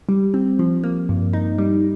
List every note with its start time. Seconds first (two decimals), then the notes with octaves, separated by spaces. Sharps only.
0.09 G3
0.34 C4
0.59 F3
0.83 A#3
1.09 G2
1.33 D#4
1.58 G3